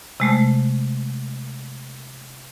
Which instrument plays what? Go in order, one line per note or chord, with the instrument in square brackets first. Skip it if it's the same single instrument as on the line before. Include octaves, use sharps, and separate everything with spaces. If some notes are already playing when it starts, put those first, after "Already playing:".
[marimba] C3 G#3 A3